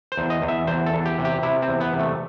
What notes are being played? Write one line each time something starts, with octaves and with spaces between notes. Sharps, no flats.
C5
E2
D#5
E2
E5
E2 C5
A4
E2
G4
C3
G4
C3 E4
C4
E2
B3
C3
A3